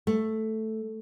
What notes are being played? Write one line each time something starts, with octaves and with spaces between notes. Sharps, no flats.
A3